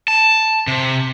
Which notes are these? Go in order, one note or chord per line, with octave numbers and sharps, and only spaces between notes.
A5
C3